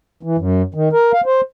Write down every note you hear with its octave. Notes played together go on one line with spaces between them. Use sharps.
E3
F#2
D#3
A#4
F5
C5